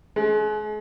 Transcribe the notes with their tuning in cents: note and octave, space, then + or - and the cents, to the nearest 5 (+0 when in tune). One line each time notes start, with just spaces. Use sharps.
G#3 +40